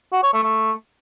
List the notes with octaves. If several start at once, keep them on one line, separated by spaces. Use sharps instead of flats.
F#4
C#5
A3
A3